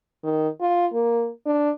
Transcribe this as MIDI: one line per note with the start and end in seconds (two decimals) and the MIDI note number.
0.23 0.48 51
0.61 0.86 65
0.93 1.29 58
1.46 1.70 62